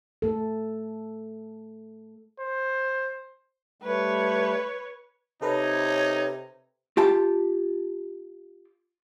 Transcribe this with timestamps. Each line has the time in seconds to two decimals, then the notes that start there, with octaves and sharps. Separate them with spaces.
0.22 A3 A4
2.40 C5
3.82 G3 A3 B4 C#5
5.42 C3 D#4 A4 B4 C#5 A#5
6.97 F4 G4 A5